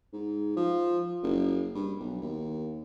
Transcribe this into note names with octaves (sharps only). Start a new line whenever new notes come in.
G#2
F3
F#1
G2
B1
D#2